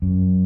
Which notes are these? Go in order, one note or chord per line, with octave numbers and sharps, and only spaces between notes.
F#2